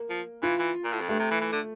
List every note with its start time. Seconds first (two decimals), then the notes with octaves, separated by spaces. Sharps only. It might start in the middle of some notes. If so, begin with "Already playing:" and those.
Already playing: A#3
0.09 F3
0.42 E3 F4
0.59 E3
0.84 A#2
0.92 A2
1.00 F2
1.09 G2 A3
1.19 C3
1.31 E3
1.41 E3
1.52 D3